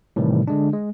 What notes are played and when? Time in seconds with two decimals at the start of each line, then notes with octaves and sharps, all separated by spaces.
0.16 A2 C3 D#3 E3 G3
0.47 D3 G#3 D4
0.73 G#3